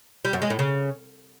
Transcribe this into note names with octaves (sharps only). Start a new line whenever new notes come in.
G3
F#2
G#3
A2
C#3